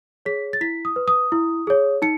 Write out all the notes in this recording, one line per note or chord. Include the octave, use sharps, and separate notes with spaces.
G#4 C#5 B6
A6
E4 B6
D#6
B4
D#6
E4
G#4 C#5
D#4 C#7